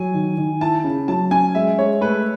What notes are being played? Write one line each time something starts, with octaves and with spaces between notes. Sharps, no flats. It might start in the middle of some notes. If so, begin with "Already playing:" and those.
Already playing: F#3 G#5
D#3
D#3
E4 A5
C#3
F#3 A5
C#4 G#5
G#3 E5
G#3 C#5
A3 B4